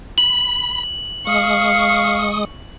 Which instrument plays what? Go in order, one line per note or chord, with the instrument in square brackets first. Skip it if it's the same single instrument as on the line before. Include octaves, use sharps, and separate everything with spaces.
[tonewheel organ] B5 [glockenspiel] F#7
[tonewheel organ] G#3 D#6 [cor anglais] F5 [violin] C#6